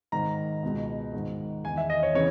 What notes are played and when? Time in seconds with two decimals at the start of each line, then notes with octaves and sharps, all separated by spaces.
0.12 G#2 D#3 A#5
0.63 C#2 B2
1.13 G#2 D#3
1.64 E2 D#3 G#5
1.77 E5
1.90 D#5
2.03 C#5
2.14 C#3 E3 C#5